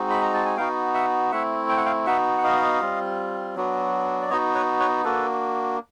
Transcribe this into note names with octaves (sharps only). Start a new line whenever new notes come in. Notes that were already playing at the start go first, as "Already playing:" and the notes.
Already playing: G#3 C4 D#4 F#4
B5
A#5
A5
G#5
B3 D#4 F#4 F5 G5
E5 F#5
A3 C4 E4 E5 F#5
G5
F#5
F5 G5
B3 D#4 F#4 E5 F#5
F#5
D#5 F5
G3 C4 F4
F#3 B3 D4 F#4
D5
B3 D#4 F#4 C#5 D#5
B4 C#5
B4 C#5
A#3 D4 F#4 A4 B4